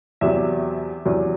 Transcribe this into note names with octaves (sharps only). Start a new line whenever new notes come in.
E2 C3 F#3 E5
E2 C3 F#3